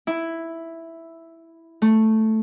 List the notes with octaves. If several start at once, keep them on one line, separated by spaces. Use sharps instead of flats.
E4
A3